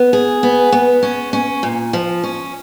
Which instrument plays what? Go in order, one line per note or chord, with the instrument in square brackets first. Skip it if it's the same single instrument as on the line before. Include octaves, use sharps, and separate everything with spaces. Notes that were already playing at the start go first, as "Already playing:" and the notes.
Already playing: [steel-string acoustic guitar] B3
G#4
B3
B3
C#4
C#4
A#2
F3
C#4